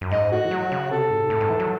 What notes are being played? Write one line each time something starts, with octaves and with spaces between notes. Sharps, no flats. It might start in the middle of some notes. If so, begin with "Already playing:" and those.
F#2
G#2 D#5
A2 F#4
E3
F#3
C#3
C3 A4
G#2
C3
A2
G#2
E3
F#3